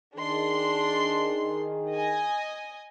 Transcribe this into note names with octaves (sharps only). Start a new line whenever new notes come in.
D#3 D4 G#4 C6
D#5 G#5